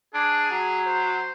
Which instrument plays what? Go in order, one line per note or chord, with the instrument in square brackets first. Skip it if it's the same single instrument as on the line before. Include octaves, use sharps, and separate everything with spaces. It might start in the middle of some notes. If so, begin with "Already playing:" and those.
[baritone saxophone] D4 [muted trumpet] G#4
[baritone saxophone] F#3
[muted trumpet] C5